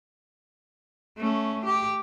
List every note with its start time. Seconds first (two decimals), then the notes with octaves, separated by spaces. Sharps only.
1.17 A3 C#4
1.65 G4